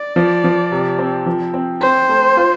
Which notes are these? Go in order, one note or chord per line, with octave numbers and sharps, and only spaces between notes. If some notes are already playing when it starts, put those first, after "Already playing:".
Already playing: D5
F3
F3
C3
C4
F3
C4
C4 C5
A3
F4